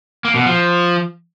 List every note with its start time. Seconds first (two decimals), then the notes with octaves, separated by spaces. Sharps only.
0.25 A#3
0.35 B2
0.46 F3